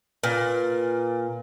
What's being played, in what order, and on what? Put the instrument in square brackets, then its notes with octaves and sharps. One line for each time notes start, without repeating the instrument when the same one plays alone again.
[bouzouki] A#2 [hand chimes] B4